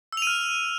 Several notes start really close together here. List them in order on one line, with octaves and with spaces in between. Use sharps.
E6 F7 D#7 F6